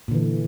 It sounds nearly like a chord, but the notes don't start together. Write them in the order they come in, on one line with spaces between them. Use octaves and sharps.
A#2 D3 E3